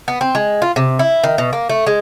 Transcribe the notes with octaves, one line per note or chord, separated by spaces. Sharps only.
B3
C4
G#3
F4
C3
E4
D#3
B2
A#3
A3
G#3